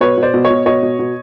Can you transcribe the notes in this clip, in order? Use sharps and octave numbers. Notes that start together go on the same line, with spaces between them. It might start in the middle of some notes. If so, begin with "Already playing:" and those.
B2 B4 C#5
B2
C5 D5
B2
C#5 D#5
B2
B2 C#5 D#5
B2
B2